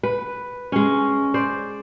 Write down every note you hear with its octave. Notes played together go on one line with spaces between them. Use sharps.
B4
G#3 C#4
C5 D5